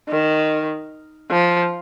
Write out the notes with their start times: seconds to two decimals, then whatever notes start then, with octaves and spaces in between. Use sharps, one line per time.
0.09 D#3
1.30 F3